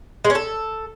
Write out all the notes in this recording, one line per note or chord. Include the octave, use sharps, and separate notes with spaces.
G#3
C#4
A4